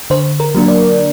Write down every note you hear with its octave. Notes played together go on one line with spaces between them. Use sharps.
D3 C5
A#4
F#3 A#3 D4
D5